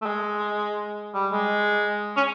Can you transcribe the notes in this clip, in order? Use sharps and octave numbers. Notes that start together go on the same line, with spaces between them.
A3
G#3
G3
G#3
C#4